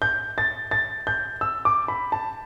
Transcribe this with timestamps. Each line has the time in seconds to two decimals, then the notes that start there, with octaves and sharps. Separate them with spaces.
0.02 G6
0.38 A6
0.71 A6
1.07 G6
1.41 E6
1.65 D6
1.88 B5
2.12 A5